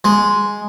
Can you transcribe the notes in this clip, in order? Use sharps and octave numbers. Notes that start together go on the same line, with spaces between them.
G#3